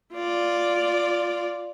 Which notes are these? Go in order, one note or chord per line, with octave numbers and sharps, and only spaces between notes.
F4 D5